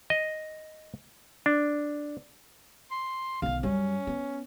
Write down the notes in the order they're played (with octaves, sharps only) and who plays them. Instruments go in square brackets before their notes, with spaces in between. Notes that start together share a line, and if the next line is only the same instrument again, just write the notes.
[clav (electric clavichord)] D#5
D4
[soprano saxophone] C6
[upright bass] B1 D#3 [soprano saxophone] F5
[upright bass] F#2 G3 [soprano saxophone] C#4
[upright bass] B3